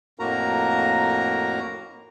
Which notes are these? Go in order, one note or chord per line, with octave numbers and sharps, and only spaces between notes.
F2 A2 A#3 F#4 A#4 A#5